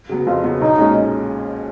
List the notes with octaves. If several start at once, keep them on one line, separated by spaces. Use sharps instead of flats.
C#3 F#3 B3
F2 F4
C#3 F#3 B3
B1 D#4
A#2 G#3 C#4